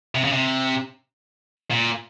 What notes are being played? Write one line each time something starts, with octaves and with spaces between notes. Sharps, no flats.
C3
C#3
C3
A#2